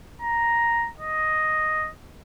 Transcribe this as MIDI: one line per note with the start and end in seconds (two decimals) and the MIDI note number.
0.22 0.89 82
1.00 1.90 75